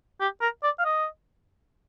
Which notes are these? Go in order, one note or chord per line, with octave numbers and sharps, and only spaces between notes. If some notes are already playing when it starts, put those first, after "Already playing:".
G4
A#4
D5
F5
D#5